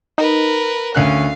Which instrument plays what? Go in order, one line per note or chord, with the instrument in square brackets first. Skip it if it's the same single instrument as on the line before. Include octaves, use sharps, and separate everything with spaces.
[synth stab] D#4 [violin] A#4 B4
[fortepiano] D2 C#4 F#6 [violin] F5